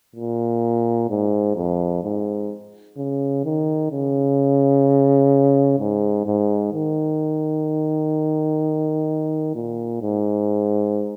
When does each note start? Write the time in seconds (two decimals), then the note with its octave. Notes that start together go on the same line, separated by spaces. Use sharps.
0.16 A#2
1.10 G#2
1.56 F2
2.04 G#2
2.97 C#3
3.45 D#3
3.91 C#3
5.79 G#2
6.26 G#2
6.73 D#3
9.55 A#2
10.02 G#2